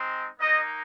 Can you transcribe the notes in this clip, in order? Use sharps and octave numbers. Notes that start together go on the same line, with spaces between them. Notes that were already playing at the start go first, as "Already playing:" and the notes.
Already playing: G#3 C4 D#4
A#3 D#4 D#5